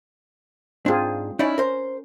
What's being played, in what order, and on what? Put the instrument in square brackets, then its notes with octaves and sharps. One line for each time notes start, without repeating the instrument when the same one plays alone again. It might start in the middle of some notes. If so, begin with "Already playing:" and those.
[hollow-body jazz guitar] G#2 D4 [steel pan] C4 F4 G#4
[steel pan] C#4 [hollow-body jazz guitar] D#4 E4 D5
[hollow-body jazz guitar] A#4 C5